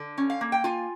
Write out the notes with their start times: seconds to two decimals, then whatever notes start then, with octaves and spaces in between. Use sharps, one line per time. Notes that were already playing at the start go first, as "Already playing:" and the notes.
Already playing: D3
0.18 C#4
0.30 F5
0.41 A#3
0.52 G5
0.64 F4 G#5